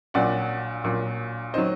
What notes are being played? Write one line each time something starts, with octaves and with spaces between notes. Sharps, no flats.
A#1 A#2 F#3 D5 F#5
A#1 A#2 F#3
D#3 F#3 C5 D#5